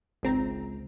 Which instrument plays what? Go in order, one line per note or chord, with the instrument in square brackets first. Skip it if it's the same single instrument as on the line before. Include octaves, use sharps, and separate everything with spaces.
[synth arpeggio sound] G#1 C4 A#5 [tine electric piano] C#2